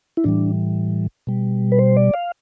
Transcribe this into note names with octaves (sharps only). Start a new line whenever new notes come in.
E4
A2 E3 G3 D4
B2 G3
B4
C5
D5
F5